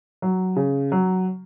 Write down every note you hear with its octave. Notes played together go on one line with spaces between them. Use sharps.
F#3
C#3
F#3